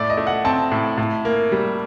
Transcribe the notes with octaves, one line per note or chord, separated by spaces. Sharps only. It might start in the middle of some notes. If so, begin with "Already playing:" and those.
Already playing: A2 A3 D5
D#5
A3
F#5
C4 A5
A2
A2
A#3
G3